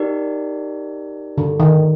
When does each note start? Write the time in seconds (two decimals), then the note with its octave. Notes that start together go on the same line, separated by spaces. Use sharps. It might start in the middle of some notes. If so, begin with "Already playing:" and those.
Already playing: D#4 G4 A#4 D5
1.38 D3
1.60 D#3